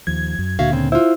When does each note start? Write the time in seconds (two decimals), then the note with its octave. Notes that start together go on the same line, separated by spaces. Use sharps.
0.07 D#2 F3 G#6
0.39 F#2
0.59 D2 A#2 D3 F#4 E5 F5
0.72 C#3 C4
0.92 E4 F4 C5